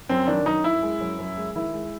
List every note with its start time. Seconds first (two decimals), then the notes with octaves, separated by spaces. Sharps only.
0.09 F#2 C4
0.27 D#3 D4
0.46 F#2 D#4
0.64 F#2 E4
0.82 G#3
1.00 F#2
1.19 F#2
1.37 G#3
1.55 D#3 E4
1.73 G#3